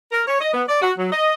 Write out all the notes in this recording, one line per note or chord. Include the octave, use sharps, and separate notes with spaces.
A#4
C#5
D#5
B3
D5
F#4
F#3
D#5